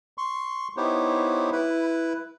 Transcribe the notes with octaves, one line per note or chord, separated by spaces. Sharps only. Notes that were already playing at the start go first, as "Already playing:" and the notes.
C6 C#6
B3 D#4 E4 G4 C5 C#5
E4 B4